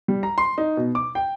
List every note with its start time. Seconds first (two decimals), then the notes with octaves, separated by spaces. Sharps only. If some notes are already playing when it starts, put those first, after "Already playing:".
0.08 G3
0.23 A#5
0.38 C6
0.58 D#4
0.77 B2
0.95 D6
1.15 G5